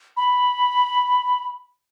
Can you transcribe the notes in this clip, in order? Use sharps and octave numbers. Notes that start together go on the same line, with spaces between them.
B5